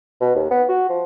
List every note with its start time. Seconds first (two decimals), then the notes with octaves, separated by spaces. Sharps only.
0.21 B2
0.35 D#2
0.51 B3
0.69 F#4
0.89 F3